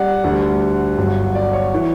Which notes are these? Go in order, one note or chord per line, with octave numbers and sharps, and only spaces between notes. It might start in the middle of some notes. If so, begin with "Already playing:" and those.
Already playing: G3 D5 F#5
D2 D3 G3
G1 G2 F#3
D5
C#5
E3